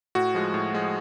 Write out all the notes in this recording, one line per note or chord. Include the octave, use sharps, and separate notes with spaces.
A2 F#4
F3 G#3
A2
F3 G#3